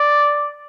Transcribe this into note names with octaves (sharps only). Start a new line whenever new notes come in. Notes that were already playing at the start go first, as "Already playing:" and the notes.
Already playing: D5